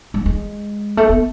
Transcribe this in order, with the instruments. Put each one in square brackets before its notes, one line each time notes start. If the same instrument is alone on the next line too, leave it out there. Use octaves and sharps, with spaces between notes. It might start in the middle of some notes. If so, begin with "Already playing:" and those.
[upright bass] G#3
G#3
A3
B3